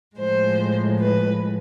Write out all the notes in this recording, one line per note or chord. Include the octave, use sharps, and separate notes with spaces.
A2 F3 G#3 C5
B4